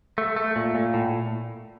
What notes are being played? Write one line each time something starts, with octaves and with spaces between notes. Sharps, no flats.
A3
A3
A#2
A#2
A2